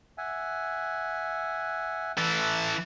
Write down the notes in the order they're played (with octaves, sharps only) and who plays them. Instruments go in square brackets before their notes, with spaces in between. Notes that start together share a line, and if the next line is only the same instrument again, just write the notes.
[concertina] E5 F#5 G#5
[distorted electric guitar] E3 A4 [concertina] B4